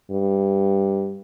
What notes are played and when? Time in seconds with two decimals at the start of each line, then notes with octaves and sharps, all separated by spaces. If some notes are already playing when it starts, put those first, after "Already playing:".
0.11 G2